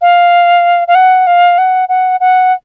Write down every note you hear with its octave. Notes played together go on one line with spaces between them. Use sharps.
F5
F5
F#5
F5
F#5
F#5
F#5